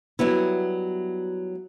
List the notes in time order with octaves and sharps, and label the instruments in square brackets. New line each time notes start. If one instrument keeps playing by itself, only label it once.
[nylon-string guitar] F#3 G3 B3 E4